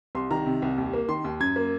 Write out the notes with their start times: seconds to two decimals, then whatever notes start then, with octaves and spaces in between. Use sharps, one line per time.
0.15 C2 C6
0.31 D#3 A#5
0.46 C3
0.62 C2
0.78 D#2
0.93 A#3
1.09 D#3 C6
1.25 D#2
1.40 F#2 G#6
1.56 A#3